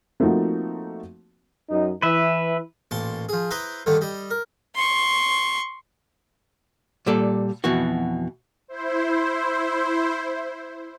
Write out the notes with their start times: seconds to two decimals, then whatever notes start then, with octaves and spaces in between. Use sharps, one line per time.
0.20 F3 A3 A#3 C4 D#4 F#4
1.70 F#2 F#3 D#4
2.02 E3 B4 E5
2.91 A1 A#2 A5 C6
3.29 F3 G#4
3.51 E4 B4 C5 A#5 C6 D#6
3.86 G2 D3 D#3 A3
4.01 G3 D#5
4.31 A#4
4.75 C6 C#6
7.06 A#2 G3 A4 D5
7.64 F2 B2 E3 F#4
8.68 E4 C5